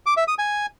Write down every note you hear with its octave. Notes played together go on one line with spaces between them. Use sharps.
D6
E5
D#6
G#5